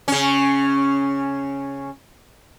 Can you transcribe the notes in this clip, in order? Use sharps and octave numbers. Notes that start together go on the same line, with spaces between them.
C#3 C#4